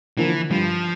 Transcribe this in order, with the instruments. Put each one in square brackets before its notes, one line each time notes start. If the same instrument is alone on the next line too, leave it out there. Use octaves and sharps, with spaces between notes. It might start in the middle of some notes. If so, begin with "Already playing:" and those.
[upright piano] D3 F3 A#3 [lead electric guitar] E3
[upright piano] G2 [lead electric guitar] F3